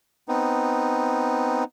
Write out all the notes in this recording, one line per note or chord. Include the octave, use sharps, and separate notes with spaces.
B3 C4 D#4